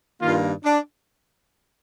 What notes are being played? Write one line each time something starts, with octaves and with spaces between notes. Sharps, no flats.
G2 D#3 A#3 F4
D4